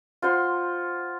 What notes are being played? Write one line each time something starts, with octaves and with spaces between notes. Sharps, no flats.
F4 C5 F#5 C6